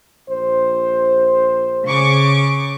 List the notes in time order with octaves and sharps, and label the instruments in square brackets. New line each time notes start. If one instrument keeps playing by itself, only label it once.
[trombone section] A#1 C5
[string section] C#3 C#6 D6